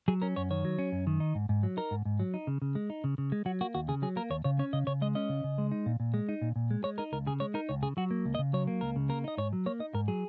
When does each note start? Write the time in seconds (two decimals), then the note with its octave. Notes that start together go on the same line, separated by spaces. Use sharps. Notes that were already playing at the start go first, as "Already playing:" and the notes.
0.08 F#3 G#4
0.22 C#4 A#4
0.36 F#2 C#5
0.50 D#3 C#5
0.65 F#3
0.79 C#4
0.92 F#2
1.07 D#3
1.20 D#4
1.35 G#2
1.49 G#2
1.63 F#3
1.77 D#4 A#4
1.91 G#2
2.05 G#2
2.20 F#3
2.34 D#4
2.47 C#3
2.62 C#3
2.75 G#3
2.90 D#4
3.04 C#3
3.18 C#3
3.32 G#3
3.46 F#3 F#4
3.61 A#3 F#4
3.75 D#2 F#4
3.88 C#3 G#4
4.02 F#3 G#4
4.16 A#3 A#4
4.30 D#2 C#5
4.44 C#3 C#5
4.59 C#4 C#5
4.73 C#3 D#5
4.87 C#3 C#5
5.02 G#3 D#5
5.15 C#4 D#5
5.29 C#3
5.44 C#3
5.58 G#3
5.71 D#4
5.86 A#2
6.00 A#2
6.14 G#3
6.29 D#4
6.42 A#2
6.56 A#2
6.71 G#3
6.84 G#3 C#5
6.98 D#4 A#4
7.12 C#2 A#4
7.27 C#3 G#4
7.40 G#3 C#5
7.54 D#4 A#4
7.69 C#2 C#5
7.83 C#3 G#4
7.97 F#3 F#4
8.11 A#3
8.25 C#2
8.35 D#5
8.39 C#3
8.53 F#3 C#5
8.67 A#3
8.81 C#2 A#4
8.96 C#3
9.09 A#3 A#4
9.24 D#4 D#5
9.38 G#2 C#5
9.53 F#3
9.66 A#3 C#5
9.80 D#4 D#5
9.94 G#2 A#4
10.08 F#3 G#4